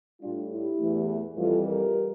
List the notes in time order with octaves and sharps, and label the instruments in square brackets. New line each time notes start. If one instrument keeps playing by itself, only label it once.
[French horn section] A2 G3 D4 F4
E4 G4
E2 E3 A3
F2 E3 G3 F4 A4
G4 A#4